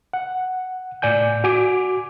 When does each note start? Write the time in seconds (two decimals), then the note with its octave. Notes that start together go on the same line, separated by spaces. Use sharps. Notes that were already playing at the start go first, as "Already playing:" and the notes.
0.13 F#5
1.02 A2 D5 G#5 G6
1.44 F#4 G#5 D6